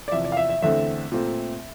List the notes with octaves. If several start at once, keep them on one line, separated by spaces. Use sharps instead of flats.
D5
E2 C3 F3 E5
D5
F5
E5
E5
E2 D3 A3 C4 E5
A#2 A3 C4